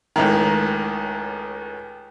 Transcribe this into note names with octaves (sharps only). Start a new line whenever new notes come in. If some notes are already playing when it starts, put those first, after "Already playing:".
C#2 A2 D#3